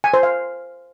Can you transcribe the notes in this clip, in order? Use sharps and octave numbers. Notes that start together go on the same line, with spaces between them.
G#5
C5
F5